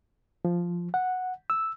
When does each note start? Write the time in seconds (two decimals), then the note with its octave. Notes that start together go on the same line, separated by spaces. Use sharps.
0.45 F3
0.94 F#5
1.50 E6